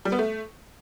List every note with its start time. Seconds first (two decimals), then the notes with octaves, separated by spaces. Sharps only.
0.05 G3
0.12 B3
0.19 A3